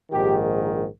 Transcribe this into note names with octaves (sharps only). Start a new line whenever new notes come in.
A#1 G#2 D#3 G4